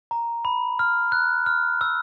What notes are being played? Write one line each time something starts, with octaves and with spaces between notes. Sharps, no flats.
A#5
B5
F6
F#6
F6
E6